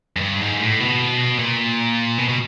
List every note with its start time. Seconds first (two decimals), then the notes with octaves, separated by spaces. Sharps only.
0.17 F#2
0.21 G2
0.41 G#2
0.60 A2
0.80 B2
1.39 A#2
2.18 B2
2.28 B2